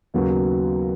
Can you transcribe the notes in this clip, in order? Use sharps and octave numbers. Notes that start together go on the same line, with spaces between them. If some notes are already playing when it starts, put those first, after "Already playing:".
D#2 C#3 F#3 B3 F#4